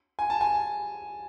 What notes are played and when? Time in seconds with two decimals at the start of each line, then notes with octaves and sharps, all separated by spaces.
0.19 G#5
0.30 A5
0.41 G#5